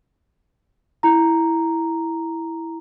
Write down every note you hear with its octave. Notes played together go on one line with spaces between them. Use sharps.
E4 A#5